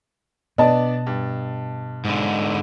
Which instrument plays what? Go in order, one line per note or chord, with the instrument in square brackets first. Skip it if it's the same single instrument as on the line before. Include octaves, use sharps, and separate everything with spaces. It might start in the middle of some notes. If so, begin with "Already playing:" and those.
[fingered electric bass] B2 [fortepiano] B3 D4 D5 [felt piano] D#5 A5
[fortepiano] G2
[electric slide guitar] G#2 D3